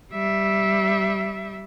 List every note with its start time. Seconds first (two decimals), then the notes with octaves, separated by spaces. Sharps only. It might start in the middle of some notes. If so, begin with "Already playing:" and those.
0.13 G3 E5